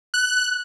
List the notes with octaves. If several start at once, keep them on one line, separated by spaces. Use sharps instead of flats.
F#6